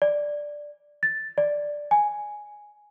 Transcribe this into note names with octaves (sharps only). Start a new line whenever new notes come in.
D5
A6
D5
G#5